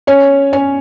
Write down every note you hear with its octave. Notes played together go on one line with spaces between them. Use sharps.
C#4 C#5
C#4 C#5